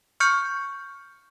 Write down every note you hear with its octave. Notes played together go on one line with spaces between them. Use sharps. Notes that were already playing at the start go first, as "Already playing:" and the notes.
C#6 F6 G6 C#7